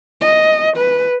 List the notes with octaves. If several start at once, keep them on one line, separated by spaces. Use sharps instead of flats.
D#5
B4